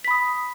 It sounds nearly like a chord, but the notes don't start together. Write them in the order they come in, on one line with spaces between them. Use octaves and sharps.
B6 B5 D#6